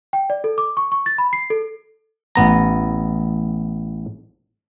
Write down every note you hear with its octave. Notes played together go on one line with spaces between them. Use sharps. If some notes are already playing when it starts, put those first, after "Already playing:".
G5
D5
A4
D6
C#6
C#6
A6
B5
C7
A4
A1 B3 A#5